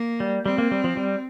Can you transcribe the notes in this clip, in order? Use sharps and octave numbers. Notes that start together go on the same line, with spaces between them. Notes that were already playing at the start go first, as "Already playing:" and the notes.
Already playing: A#3
G3
G3 C4
A#3
G3
F3
G3